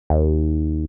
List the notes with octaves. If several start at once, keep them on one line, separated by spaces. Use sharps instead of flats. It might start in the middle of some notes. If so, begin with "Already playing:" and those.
D#2